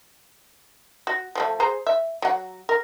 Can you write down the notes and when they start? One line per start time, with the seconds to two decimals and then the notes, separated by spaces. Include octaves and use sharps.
1.07 F#4
1.35 F3 G#3 A3
1.60 G#4 C5 A#5
1.87 E5
2.22 F#3 F#5
2.69 A#4